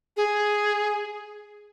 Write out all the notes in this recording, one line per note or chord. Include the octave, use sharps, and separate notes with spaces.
G#4